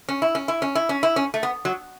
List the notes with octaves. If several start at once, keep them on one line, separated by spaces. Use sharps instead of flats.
C#4
E4
C#4
E4
C#4
E4
C#4
E4
C#4
A3
B3
F#3